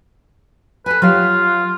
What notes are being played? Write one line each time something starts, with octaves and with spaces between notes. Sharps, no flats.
A4 B4 G#5
F#3 F4 G4 F5